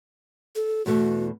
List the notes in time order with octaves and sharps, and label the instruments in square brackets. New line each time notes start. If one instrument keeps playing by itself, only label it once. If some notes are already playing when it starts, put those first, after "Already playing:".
[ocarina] A4
[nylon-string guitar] E2 B2 A3 [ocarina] F#4